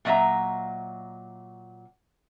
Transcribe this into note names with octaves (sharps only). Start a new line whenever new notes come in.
A#2 F#3 D#5 E5 A#5